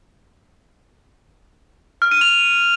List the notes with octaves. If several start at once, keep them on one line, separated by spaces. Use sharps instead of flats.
F6
D#7
F7